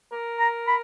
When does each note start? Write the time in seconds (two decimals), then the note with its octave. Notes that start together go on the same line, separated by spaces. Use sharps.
0.12 A#4
0.40 A#5
0.67 B5